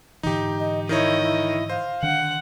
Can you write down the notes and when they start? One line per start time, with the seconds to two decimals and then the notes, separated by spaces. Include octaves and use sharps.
0.23 G#2 D3 E3 D#4 G4
0.60 D#5
0.89 D#3 D#4 E4 C#5 D#5
1.22 E4
1.70 C5 F5
2.03 D3 D#3 D4 F#5